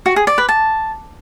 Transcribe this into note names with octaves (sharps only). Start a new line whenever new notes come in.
F#4
G#4
D5
B4
A5